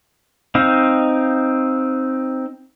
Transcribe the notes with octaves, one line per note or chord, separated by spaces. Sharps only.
C4 D#4 F5